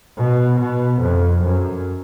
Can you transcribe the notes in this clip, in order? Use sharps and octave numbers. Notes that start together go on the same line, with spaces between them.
B2
B2
F2
F#2